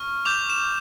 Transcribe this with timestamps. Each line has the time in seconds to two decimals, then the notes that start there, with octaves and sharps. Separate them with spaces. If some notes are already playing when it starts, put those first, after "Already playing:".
Already playing: C#6 F6
0.25 D6 G6 F7
0.50 E7